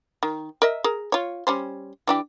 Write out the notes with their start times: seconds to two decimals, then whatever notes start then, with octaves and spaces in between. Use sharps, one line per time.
0.23 D#3
0.62 A#4 D#5 E5
0.84 G#4 A#4
1.12 F4 C#5
1.47 G3 C#4 C5
2.07 E3 D4 G4